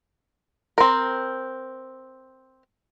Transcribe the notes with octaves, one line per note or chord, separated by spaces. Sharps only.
C4 A#4